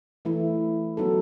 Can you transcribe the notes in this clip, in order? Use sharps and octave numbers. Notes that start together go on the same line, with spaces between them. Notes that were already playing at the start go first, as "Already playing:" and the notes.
E3 A3 E4
F#3 B3 D#4 F#4 A4